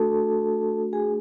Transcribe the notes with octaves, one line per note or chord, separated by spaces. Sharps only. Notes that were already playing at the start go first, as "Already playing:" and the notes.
Already playing: A3 D4 F#4 A4 A5
G#4 G#5